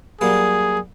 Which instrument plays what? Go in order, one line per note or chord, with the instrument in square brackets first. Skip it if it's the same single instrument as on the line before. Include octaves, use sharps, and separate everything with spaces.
[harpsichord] F#3 G3 A#3 [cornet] G#4